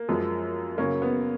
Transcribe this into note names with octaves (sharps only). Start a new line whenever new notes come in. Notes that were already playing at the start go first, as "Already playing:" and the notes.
Already playing: A#3
F#2 F3 G#3
F#2 C#3 F#3 A#3 C#4
B3